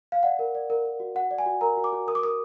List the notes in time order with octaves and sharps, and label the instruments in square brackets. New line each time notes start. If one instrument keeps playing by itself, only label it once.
[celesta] F5
D5 F#5
A#4
D5
A#4
A#4
F#4
F#4 F#5
D5
G#5
F#4
A#4 A#5
F#4
D6
F#4
A#4 D#6
D6
A#4 D#6